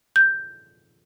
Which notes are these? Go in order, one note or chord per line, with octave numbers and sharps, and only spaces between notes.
G6